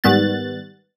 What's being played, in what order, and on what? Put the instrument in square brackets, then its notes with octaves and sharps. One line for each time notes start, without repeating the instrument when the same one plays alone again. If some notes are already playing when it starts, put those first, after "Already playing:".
[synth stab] G#2 D#3 G3 B3 F#6 A6